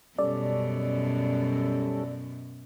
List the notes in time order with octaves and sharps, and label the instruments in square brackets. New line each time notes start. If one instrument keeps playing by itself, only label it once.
[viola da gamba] F#2 B2 [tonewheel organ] G3 C#4 A4 [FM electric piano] D5